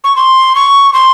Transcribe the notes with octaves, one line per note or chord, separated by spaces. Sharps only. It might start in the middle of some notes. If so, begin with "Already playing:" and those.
C#6
C6
C#6
C6